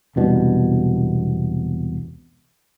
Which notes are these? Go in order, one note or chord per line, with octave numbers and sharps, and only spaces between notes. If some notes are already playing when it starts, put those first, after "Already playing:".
E1 C2 B2 D4